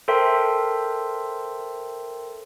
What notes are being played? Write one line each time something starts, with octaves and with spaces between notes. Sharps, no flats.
A4 A#4 C5 E5 G5 C6